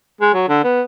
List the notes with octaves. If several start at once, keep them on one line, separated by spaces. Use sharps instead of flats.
G#3
F#3
D3
B3